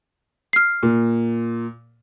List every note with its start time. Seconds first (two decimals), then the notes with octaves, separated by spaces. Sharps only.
0.53 F6 C7
0.83 A#2